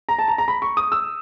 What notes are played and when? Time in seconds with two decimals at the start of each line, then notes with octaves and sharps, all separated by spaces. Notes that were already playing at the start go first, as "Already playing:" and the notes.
0.09 A#5
0.19 A5
0.28 A#5
0.38 A#5
0.48 B5
0.62 C#6
0.77 D#6
0.92 E6